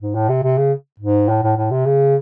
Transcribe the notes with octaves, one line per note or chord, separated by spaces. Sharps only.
G#2
A2
C3
C3
C#3
G#2
A2
A2
A2
C3
C#3